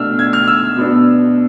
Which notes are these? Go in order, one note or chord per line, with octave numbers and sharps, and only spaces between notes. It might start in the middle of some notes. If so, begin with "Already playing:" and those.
Already playing: B2 A3 D4 E6 F6
G#6
F6
E6
B2 B3 D4